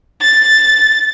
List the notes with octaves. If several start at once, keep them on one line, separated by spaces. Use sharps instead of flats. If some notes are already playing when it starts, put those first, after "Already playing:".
A6